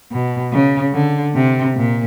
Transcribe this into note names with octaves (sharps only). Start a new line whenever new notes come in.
B2
C#3
D3
C3
A#2